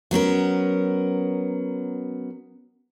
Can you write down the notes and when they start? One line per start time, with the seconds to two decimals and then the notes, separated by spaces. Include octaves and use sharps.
0.11 F#3 B3 C#4 A#4